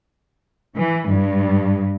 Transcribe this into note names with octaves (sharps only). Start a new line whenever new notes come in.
E3
G2